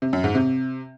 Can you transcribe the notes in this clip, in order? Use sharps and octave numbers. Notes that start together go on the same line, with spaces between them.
C3
F#2
G#2
C3